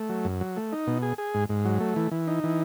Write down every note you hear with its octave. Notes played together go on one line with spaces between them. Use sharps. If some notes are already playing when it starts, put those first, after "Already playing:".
Already playing: A3
F#3
F#2
F#3
A3
D#4
B2
G#4
G#4
G#2
G#2
F#3
A3
E3
E3
D#4
E3